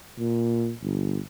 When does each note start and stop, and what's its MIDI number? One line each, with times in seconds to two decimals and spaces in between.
0.18 0.73 46
0.83 1.19 31